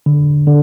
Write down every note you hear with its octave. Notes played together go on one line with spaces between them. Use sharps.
D3
D3